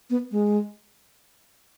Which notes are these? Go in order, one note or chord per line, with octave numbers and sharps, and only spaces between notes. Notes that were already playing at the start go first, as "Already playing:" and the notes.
B3
G#3